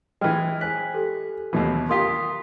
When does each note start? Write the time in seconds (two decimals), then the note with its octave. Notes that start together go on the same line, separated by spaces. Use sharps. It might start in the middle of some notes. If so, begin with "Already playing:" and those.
0.21 E3 G#3 G5 F6
0.61 C5 G#5 F#6 B6
0.94 G4 A4
1.53 D#2 B2 E3
1.89 A#3 F4 G4 C6 D#6 B6